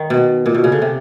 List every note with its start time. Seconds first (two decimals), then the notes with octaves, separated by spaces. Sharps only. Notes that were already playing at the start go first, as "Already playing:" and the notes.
Already playing: D#3
0.10 B2
0.46 A#2
0.55 B2
0.64 C#3
0.72 D3
0.82 C3